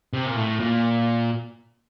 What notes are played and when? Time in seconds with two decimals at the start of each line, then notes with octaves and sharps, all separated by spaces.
0.14 C3
0.26 A#2
0.36 A2
0.60 A#2